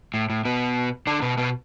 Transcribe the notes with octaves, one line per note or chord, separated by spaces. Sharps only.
A2
A2
B2 B3
D3 D4
B2 B3
B2 B3